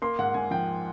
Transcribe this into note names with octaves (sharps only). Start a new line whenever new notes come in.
A#3 C6
G#2 F#5
G#2 G#5
F3 G5